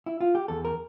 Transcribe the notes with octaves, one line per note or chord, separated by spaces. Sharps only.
E4
F4
G4
E2 A4
A#4